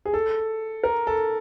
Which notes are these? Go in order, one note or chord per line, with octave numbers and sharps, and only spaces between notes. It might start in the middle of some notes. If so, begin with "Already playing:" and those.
G#4
A4
A#4
A4